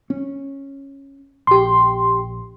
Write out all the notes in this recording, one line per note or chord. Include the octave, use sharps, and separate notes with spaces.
C#4
A#1 G4 C6